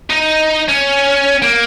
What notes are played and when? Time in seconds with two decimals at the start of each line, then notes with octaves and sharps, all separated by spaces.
0.10 D#4
0.68 C#4
1.42 A#3